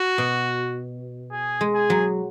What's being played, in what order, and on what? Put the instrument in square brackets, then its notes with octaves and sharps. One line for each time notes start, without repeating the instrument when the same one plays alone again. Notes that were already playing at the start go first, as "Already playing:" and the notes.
Already playing: [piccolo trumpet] F#4
[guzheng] B2
[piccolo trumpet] G#4
[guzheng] G#3
[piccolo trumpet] G#4
[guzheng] F#3